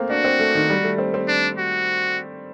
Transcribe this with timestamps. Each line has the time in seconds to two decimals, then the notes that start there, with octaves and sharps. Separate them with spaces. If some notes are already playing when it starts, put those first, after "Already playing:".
Already playing: A3 A#3 C4
0.10 D4 F#4
0.24 C4
0.40 A3
0.55 D#3
0.70 G3
0.84 A3
0.98 C4
1.14 C4
1.28 D4
1.58 F#4